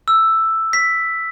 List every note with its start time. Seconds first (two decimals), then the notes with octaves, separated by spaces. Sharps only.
0.08 E6
0.73 B6